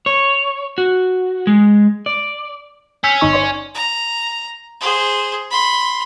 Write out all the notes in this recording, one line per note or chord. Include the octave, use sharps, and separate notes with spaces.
C#5
F#4
G#3
D5
C#4 E6 G6 B6
G1 D#4 C#6
C#5 D5 C6
A#5
G#4 C5
B5 C6